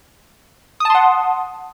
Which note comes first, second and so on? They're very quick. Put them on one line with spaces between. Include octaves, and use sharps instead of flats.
D#6 A5 C6 F#5